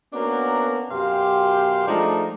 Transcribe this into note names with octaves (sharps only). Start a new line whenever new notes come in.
A#3 B3 C#4 D4 F#4 A#4
F#2 B2 G4 F5 G5 C6
F3 G#3 A3 D4 D#4